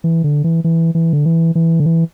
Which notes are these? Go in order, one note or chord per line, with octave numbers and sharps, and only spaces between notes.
E3
D3
E3
E3
E3
D3
E3
E3
D3
E3